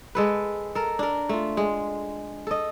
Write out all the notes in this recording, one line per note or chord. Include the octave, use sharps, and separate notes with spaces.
G#3 A4 B4
A4 A#4
D4 A#4
A3 F4
G#3
A4 D#5